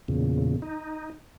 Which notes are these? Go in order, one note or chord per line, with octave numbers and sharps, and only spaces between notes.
E2 A#2 C#3
D#4